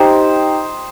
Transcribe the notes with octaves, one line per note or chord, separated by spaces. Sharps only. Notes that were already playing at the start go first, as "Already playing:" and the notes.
Already playing: D#4 G4 C5